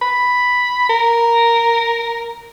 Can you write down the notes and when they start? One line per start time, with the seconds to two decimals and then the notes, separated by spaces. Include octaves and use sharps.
0.01 B5
0.90 A#4